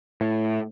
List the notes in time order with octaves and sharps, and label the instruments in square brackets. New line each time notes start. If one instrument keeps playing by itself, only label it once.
[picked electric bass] A2